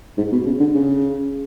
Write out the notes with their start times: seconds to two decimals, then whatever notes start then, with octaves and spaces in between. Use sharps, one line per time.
0.17 G#2
0.32 B2
0.46 C#3
0.60 D3
0.74 C#3